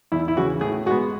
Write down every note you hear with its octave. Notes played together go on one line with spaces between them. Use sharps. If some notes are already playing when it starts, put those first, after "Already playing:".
E2 E4
E4
C#3 E3 F#4
A2 G#4
G#3 B3 F#4